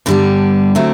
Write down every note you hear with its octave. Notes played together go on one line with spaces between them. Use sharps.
G2 D3 G3 B3
D3 F#3 A3 C4